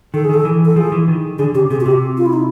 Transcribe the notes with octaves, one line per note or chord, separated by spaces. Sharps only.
D#3 A4
G#4
D#3 A4
E3
A4
F3 G#4
E3
D#3
D3 G#4
C#3 G4
C3 G#4
F#4
C3 G4
F4
E4
D#4